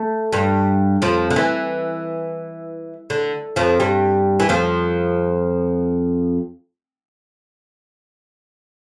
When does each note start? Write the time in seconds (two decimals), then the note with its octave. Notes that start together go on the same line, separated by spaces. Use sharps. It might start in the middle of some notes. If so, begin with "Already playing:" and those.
Already playing: A3
0.32 G2 G3
1.02 F2 F3
1.30 D3
1.36 E3
3.10 D3
3.56 F2 F3
3.80 G2 G3
4.40 E3
4.49 F2 F3